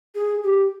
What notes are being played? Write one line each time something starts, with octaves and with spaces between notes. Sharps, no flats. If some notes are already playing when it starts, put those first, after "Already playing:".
G#4
G4